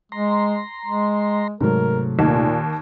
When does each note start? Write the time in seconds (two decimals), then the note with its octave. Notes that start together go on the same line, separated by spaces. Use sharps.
0.12 G#3 A#5 C6
0.86 G#3
1.61 G#2 C3 F#3 A3 A#4
2.19 D#2 A#2 A#3